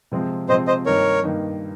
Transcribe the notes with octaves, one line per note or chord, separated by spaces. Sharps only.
C3 F3 G#3 C4
C3 F3 G#3 C4 C5 D#5
C5 D#5
G2 D#3 A#3 D#4 A#4 C#5
G2 D#3 A#3 D#4